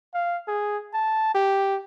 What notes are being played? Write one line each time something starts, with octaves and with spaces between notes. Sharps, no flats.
F5
G#4
A5
G4